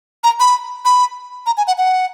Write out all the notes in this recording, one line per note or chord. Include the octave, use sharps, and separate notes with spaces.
A#5
B5
B5
A#5
G#5
F#5
F#5